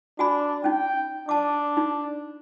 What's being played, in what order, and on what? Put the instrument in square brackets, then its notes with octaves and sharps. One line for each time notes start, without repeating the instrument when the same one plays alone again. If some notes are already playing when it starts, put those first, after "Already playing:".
[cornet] D4 [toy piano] F#4 G#5 B5
[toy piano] C#4 D#4 [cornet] G5
[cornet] D4 [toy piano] A5 D6
[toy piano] D#4